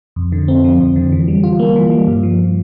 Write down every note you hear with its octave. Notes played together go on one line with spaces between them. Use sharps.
F2
D3
C4
F3
F2
D3
E3
G3
F4
A#3
E3
G3
G2
F3